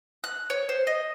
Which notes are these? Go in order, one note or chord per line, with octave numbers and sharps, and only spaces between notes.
F#6
C#5
C5
D#5